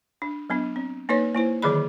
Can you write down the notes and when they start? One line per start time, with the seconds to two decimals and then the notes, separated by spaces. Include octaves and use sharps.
0.22 D4
0.50 F#3 B3 D4
0.76 C4
1.09 A#3 D#4 B4 C#5
1.34 A#3 E4 C5
1.62 D3 D#3 F#3 G#4 D5 B5